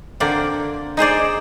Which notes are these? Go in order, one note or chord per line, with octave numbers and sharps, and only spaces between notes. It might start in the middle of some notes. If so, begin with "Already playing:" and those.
D3 A#3 C4 D5
D#4 G#4 C5 D5